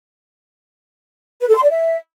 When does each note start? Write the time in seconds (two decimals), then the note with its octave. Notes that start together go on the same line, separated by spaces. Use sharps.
1.40 B4
1.48 A4
1.55 C6
1.62 D5
1.70 E5